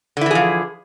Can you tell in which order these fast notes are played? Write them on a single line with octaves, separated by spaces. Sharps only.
D3 E4 E3 G#4 F3